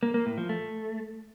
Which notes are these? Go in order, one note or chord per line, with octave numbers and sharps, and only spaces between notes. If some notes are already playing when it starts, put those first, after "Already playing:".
A#3
A#3
A2
F3
A3